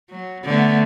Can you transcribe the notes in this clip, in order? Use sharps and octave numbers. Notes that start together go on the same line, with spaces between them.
F#3
D3 A3 B3